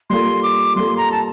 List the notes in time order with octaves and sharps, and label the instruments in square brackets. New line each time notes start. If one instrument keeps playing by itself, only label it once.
[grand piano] G3 A#3 F4 A4 [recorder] C6
[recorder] D6
[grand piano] G3 A#3 F4 A4 [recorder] C6
[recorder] A#5
A5